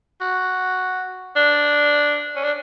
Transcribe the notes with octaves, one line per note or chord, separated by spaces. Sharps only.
F#4
D4
C#4
D4